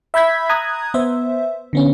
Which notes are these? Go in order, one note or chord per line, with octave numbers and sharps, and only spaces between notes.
E5 B5 G6 G#6 B6
A#5 D#6 F#6 G#6
B3 C5 E5
D3 B3 C#4